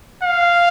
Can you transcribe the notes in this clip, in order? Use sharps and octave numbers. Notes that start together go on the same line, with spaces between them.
F5